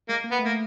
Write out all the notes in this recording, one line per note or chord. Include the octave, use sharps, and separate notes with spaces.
G#3 A#3
A#3
B3
A3
A#3